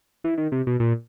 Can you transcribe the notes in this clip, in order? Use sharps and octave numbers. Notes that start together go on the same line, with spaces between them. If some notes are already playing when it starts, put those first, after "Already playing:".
E3
D#3
C3
B2
A#2